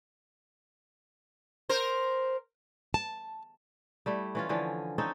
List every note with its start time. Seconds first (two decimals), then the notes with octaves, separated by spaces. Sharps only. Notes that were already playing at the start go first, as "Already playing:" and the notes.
1.69 A#4 C5
2.94 A5
4.06 G3 A3 E4
4.35 E3 C#4 F4
4.49 D3 E3 F3 C#4
4.98 C4 C#4 D#4 A4